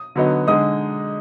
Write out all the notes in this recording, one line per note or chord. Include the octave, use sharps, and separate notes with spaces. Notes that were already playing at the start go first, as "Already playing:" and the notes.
Already playing: D#6
D3 F#3 B3 D#4
D3 G#3 D#4 D#6